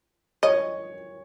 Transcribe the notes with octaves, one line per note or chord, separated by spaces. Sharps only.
C#5 D#5